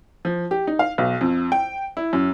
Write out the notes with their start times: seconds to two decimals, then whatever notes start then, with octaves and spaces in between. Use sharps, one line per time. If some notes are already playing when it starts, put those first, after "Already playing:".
0.25 F3
0.51 G4
0.67 D#4
0.79 F5
0.98 B1
1.21 F2
1.52 G5
1.97 E4
2.13 F#2